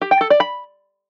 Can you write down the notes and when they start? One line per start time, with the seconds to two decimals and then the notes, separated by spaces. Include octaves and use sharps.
0.01 G4
0.11 G5
0.21 A4
0.30 D5
0.40 B5